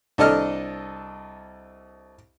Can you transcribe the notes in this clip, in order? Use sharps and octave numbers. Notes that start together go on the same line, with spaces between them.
C2 D4 A4 D#5 F6